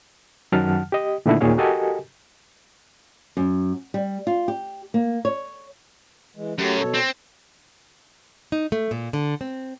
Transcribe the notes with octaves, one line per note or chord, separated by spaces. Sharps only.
F#2 D#3 F#3 F#5 A5 F6
G4 D#5
A#2 D3 D#3 A3 D4 E4
D#2 A#2 D#3 G#4 C#5 F5
F#4 G4 A4 A#4 D#5 G#5
F#2
G3
F4
G4
A#3
C#5
E3 G#3
F#2 F#3 A3 G4
B2 A4 C#5
C4
D#4
A3
A#2
D3
C4